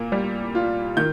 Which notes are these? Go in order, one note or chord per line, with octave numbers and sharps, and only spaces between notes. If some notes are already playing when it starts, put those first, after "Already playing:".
Already playing: A#2 A#3
G3
F4
D#3 G6